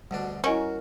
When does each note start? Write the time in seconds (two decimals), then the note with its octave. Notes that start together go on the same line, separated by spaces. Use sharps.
0.11 D2 B2 G3 D4
0.44 C#4 E4 F#4 A#4 D#5 G#5